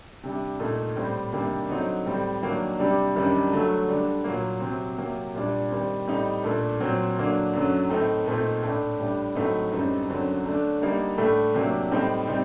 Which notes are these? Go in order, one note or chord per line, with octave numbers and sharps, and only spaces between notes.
C3 G3 D4
A#2 A3 D#4
A2 G3 C4
C3 D#3 G3 A#3 D4
D3 F#3 C4 D#4
A2 G3 C4
D#3 F#3 A#3 D4
C3 G3 D4
F#2 D#3 G3 D4
D3 F#3 A3
D3 G3 D4
A#2 F#3 A#3
C3 F#3 C4
C3 F#3 A#3
A#2 G3 D4
D#3 G3 C4
A2 G3 C4 D#4
A#2 A3 D4
A#2 F#3 C4
D3 F#3 A#3 D4
F#2 D3 F#3
A2 A3 C4 D#4
A#2 A3 C4 D#4
A2 A3 D4
A2 G3 D4
A2 F#3 A3 C4 D#4
F#2 D3 G3 C4 D#4
F#2 D3 F#3 C4
D3 A3 D4
D3 G3 A#3 D#4
A2 A3 D4
C3 F#3 A#3 D4
A2 G3 C4 D#4
C3 G3 C4 D#4